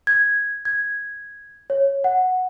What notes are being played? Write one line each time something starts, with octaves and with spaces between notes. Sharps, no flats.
G#6
G#6
C#5
F#5